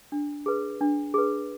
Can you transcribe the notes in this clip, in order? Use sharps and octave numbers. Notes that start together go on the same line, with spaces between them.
D4
G#4 B4
D4
G#4 B4